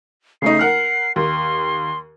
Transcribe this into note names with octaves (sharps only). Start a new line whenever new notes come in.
C#3 A3 D#4 C7
A#4 F#5 F6
D#2 C6